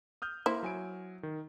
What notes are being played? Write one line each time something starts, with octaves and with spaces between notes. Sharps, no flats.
D#6 F6 G6
A#3 E4 C5
F#3 G#5 D7
D#3